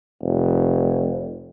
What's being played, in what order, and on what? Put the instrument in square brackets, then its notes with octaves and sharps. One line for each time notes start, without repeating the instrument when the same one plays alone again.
[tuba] F1